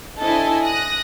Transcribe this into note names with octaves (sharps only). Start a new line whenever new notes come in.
D4 E4 A4 C5 D#5 G#5
D#6 F#6 A#6